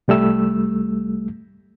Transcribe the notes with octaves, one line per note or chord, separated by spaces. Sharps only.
C2 G3 A3 E6